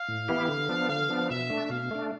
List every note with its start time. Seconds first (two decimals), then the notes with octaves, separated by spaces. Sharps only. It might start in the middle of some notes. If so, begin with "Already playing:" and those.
Already playing: F5
0.08 A2
0.28 E3 B3 E4 G4
0.48 D3
0.69 F3 B3 D4
0.89 D3 F5
1.09 F3 B3 D4
1.30 B2 E5
1.50 A3 D4
1.70 B2 F5
1.91 A3 D4